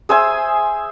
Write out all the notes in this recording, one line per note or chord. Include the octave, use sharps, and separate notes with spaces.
G#4 C5 E5 G#5